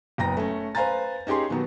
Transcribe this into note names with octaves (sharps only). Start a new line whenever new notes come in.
F#1 B3 G5 A#5 A#6
A3 C#4
B4 C5 F5 G#5 A#5 A6
C#4 D#4 G4 G#4 C6
B2 D#3 F#3 B3